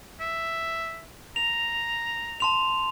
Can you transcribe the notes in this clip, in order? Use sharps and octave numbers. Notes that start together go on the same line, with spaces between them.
E5
A#5 F7
A5 C6 F7